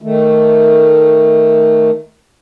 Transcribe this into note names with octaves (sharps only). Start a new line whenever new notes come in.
D#3 A3